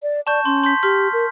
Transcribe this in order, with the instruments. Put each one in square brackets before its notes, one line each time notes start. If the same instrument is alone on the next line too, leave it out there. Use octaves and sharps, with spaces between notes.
[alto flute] D5
[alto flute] D5 [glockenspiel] A5 C#6 G6
[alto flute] C#4 [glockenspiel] C6
[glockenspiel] C6 G6 B6
[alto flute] G4 [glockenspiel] C6 F6 B6
[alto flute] A#4